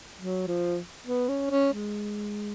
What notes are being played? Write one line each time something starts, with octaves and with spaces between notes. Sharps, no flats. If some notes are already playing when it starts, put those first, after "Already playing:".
F#3
F3
B3
C#4
C#4
G#3